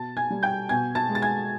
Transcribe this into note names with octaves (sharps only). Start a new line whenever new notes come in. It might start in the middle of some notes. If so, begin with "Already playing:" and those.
Already playing: B2 A5 A6
G#5 G#6
G3
G5 G6
B2 G#5 G#6
A5 A6
G#3
A6
G#5 G#6